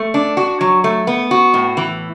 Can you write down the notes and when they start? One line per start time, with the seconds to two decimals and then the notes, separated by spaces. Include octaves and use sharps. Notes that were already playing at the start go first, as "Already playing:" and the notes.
Already playing: A3
0.14 D4
0.37 F#4
0.61 F#3
0.84 A3
1.07 B3
1.31 F#4
1.54 A2
1.77 E3